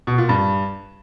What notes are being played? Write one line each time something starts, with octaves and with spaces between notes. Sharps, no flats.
B2
A#2
G2